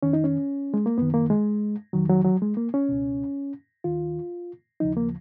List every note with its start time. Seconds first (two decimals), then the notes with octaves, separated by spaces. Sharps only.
0.03 F2 D#3 C#4
0.13 D#4
0.24 C#4
0.74 G#3
0.86 A#3
0.98 F#2 D#3 B3
1.14 A#3
1.30 G#3
1.93 F2 D#3 F#3
2.09 F#3
2.25 F#3
2.42 G#3
2.57 A#3
2.74 C#4
2.89 C#2 B2
3.84 D#2 D#3 F4
4.80 D#2 C#3 F3 D#4
4.97 A#3